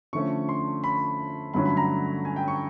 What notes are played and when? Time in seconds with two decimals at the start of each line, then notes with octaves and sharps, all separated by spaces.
0.13 D3 F3 A3 C#4 C#6
0.49 C6
0.84 B5
1.54 G2 D3 F#3 A3 C#4 B5
1.65 B5
1.77 A#5
2.25 G#5
2.36 G5
2.48 C#6